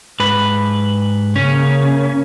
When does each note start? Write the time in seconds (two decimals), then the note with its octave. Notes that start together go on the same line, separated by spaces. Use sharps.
0.20 G#2 B4
1.36 C#3 A#3 C#4